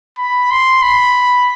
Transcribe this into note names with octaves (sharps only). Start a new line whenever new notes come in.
B5
C6
B5